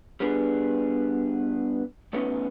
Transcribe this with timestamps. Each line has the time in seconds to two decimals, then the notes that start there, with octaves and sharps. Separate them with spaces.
0.20 G3 B3 D4 G#4
2.13 E3 A3 B3 C#4 D#4